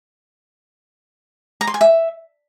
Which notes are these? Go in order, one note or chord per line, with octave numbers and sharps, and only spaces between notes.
A#5
C6
G#5
E5